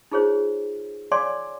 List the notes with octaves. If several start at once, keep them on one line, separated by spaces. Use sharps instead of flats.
D#4 F4 G#4 C5 C#5
C#5 D5 F5 G#5 C6 D6